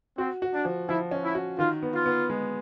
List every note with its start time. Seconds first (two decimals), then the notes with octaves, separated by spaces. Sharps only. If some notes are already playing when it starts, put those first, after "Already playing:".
0.18 C4 F#4
0.42 F#4
0.54 D4
0.65 F3
0.89 F3 E4
1.11 C#4
1.24 E4
1.35 F#4
1.59 D#3 F4
1.83 B3
1.94 F4
2.06 B3
2.30 G#3